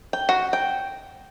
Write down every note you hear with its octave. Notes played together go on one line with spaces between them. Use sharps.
G5
F#4
G5